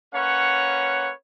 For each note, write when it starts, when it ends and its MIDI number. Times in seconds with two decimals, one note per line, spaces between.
0.15 1.11 58
0.15 1.11 61
0.15 1.11 71
0.15 1.11 73
0.15 1.11 78